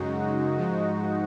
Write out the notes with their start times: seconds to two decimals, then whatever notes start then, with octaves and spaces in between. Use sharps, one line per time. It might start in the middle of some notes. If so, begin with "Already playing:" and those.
Already playing: F#2 C#3 G#3 D#4 F#4
0.57 G#2 F3 G#3